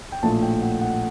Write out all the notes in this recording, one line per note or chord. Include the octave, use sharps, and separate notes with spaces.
G5
A#1 A2 A3 A5
G5
F#5
F#5